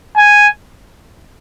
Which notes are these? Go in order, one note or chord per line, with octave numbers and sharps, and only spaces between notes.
G#5